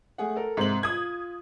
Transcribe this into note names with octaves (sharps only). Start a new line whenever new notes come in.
A3 G#4 F#5
A4 A#4
G#2 C3 C5 F#7
F4 D#6 G#6